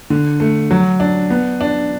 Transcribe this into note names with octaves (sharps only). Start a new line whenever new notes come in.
D3
A3
F#3
D4
B3
D4